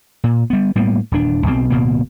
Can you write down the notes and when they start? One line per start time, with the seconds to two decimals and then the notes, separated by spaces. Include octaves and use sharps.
0.24 A#2
0.50 G3 B3
0.76 A2 G3 A#3 B3
1.12 D#1 E2 D4
1.46 B1 B2 C4
1.70 D1 B2 A#3